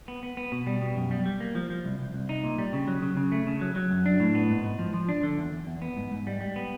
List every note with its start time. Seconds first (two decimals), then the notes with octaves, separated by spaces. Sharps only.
0.08 B3
0.23 B3
0.37 B3
0.52 B2
0.67 G3
0.82 B2
0.96 F#2
1.11 G3
1.26 G3
1.40 A#3
1.55 F3
1.70 F3
1.85 C2
1.99 C2
2.14 C2
2.29 D#4
2.44 A#2
2.58 G3
2.73 C#3
2.88 F#3
3.02 C#3
3.17 C#3
3.32 A3
3.47 C#3
3.61 F#3
3.76 F#3
3.91 F#2
4.06 D4
4.20 A2
4.35 B3
4.50 G#2
4.64 G#2
4.79 F3
4.94 F3
5.09 D4
5.23 D3
5.38 E2
5.52 E2
5.67 E2
5.82 B3
5.97 G#2
6.12 G#2
6.27 G3
6.41 G3
6.56 B3